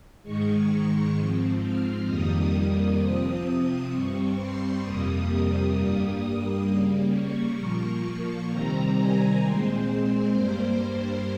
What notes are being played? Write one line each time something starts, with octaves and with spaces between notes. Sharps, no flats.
G#2 D#3 G#3 C#6
G#2 F3 C4
F6
F2 D#3 G3 A#3 D#6
C3 F3 C4
G2 G3 C4 C#6
C6
F2 C3 G3 A#3 D#6
G2 G3 A#3 D#6
C#3 G3 A#3
C#6
A#2 F3 A#3
C3 D#3 G3 C4 A#5
G#5
A#2 G#3 C4 C5
G2 G3 A#3 C5